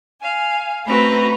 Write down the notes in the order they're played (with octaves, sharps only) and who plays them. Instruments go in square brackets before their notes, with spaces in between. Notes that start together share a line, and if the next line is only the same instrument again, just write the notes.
[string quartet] F5 G#5
[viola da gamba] A3 C4 B4 [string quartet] F#4 A#5 B5